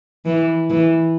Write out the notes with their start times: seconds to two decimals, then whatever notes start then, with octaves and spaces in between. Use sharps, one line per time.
0.25 E3
0.70 E3